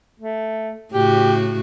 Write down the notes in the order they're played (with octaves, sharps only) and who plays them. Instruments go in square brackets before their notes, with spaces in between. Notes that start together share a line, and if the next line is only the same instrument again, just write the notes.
[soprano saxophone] A3
[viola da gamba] A2 C#3 F#4 [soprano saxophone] G4